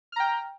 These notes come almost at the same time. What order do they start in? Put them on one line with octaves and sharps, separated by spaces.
F6 A#5 G5